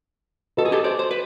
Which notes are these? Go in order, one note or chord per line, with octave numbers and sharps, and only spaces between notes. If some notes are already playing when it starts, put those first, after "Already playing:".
F#4 A4 B4 D#5
G#4
G4 A4
C5 D5
C5
B4